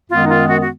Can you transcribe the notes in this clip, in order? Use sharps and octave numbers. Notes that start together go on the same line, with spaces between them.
F#2 D#3 G#3 B3 F4
D#4
F4
F#4
F#4